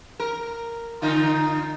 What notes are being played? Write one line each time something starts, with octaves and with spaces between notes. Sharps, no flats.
A#4
D3 D#4 F4